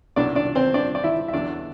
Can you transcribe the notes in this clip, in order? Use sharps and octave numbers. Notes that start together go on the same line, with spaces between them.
C2 B2 F#3 D4 D5
D4 D5
C4 C5
D4 D5
D5
E4 E5
E5
E2 D3 F#3 D4 D5